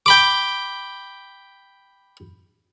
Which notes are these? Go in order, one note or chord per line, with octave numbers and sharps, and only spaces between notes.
G5 B5 D6